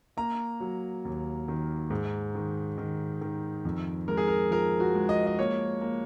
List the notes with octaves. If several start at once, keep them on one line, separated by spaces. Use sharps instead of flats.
A#3 A#5
F#3
D#2
D#3
G#2
D#3
D#3
D#3
F2
G#3 A#4
G#4
A#4
F3 A#4
F#4
G#3
D#5
D#5
A#3 C#5
A#3